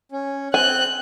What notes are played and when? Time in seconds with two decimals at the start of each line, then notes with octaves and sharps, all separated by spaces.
0.12 C#4
0.54 C4 G#5 F#6 G6